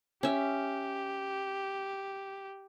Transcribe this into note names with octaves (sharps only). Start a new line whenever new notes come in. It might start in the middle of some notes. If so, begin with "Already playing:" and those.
C#4 G4 E5